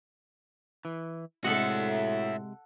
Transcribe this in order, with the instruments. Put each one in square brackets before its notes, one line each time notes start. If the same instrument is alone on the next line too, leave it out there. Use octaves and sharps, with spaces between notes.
[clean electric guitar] E3
[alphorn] A2 [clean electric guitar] C3 G#3 D#5 [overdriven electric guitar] F#4 E5 [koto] A4 F#5